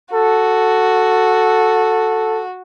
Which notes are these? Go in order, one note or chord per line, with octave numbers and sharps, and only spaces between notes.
F#4 A4